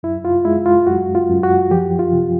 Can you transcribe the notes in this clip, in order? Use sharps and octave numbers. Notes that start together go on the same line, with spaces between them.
F#2 E4
F4
G#3 E4
F4
F#2 F#4
F4
F#2
F#4
F3 G4
F4
C3